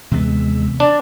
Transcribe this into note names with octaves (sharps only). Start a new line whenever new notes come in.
D#2 C3 E3 G#3 B3 E6
D4 D5